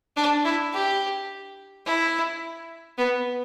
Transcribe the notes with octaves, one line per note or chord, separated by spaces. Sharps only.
D4
E4
G4
E4
B3